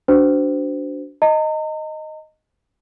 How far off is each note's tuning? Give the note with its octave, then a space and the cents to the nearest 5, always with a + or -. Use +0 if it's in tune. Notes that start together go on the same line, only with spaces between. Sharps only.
D4 -20 F#4 +0 C5 -30
D#5 +0 A#5 -40